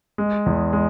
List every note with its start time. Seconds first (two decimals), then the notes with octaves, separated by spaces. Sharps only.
0.18 G#3
0.46 E2
0.73 G#3